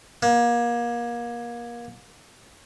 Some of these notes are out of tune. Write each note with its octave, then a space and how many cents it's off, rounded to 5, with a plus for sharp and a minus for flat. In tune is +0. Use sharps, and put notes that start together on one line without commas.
A#3 +30